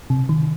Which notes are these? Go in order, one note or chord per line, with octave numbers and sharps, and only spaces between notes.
C3
D#3